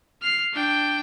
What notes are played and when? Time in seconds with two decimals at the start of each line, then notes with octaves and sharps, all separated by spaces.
0.22 F6 C7
0.53 D4 G5